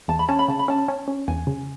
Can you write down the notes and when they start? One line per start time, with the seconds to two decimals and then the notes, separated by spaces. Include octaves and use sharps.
0.08 E2 A5
0.19 B5
0.28 C#4 A5
0.39 B5
0.48 C#3 A5
0.59 B5
0.68 C#4 A5
0.88 C#4
1.08 C#4
1.28 E2 G#5
1.47 C#3